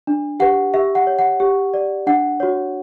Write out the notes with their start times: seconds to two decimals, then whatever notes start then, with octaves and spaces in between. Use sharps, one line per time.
0.07 D4
0.40 G4 B4 F#5
0.74 G4 E5
0.95 F#5
1.07 C#5
1.19 F#5
1.40 G4
1.74 D5
2.07 D4 F#5
2.40 F#4 C#5